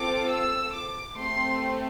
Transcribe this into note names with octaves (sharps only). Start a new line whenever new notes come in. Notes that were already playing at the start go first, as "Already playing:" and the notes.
Already playing: C4 F4 A4 D6
E6
D6
A3 C4 G4 C6